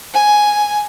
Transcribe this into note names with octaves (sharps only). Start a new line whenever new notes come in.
G#5